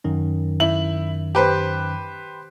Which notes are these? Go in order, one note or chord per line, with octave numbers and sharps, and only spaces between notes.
F#2 D#3 C#4
E4 F#7
G4 B4 C5